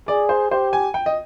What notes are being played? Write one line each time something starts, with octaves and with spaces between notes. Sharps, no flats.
G#4 D5
C5
G4 C5
G#5
G5
D#5